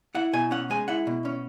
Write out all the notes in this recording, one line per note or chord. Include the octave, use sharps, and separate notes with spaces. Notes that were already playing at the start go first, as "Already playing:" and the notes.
E4 F#5
B2 G#5
C#4 F#5
G#3 G#5
E4 F#5
B2
C#4